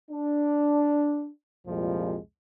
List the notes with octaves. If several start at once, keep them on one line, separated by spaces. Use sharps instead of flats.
D4
C2 F2 A#2 F3 G3 G#3